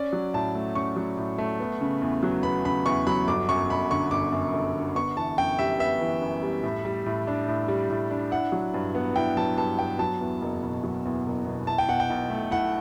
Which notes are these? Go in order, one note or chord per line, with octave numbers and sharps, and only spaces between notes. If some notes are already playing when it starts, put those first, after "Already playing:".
Already playing: C#4 D5
F#3
A2 A5
A3
C#4 C#6
F#3
A2
A3
B3
C#3
E2
F#3
B3 B5
C#3 B5
E2 C#6
F#3 B5
G1 D6
F#2 C#6
G1 B5
D3 C#6
G1 D6
F#2
G1
D3
B3 C#6
E3 A5
F#2 G5
G3 E5
B3 E5
E3
F#2
G3
A2
G3
A2
D4
A2
G3
A2
D4
E4 F#5
F#3
G2
B3
E4 G5
F#3 A5
G2 A5
B3 G5
F#3 A5
E2
F#1
B2
F#3
E2
F#1
B2
E4 A5
G5
B2 F#5
G5
B1
A3
E4 F#5